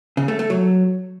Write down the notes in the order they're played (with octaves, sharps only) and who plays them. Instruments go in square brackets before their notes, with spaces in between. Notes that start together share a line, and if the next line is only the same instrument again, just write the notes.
[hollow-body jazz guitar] C#3
A3
A3
F#3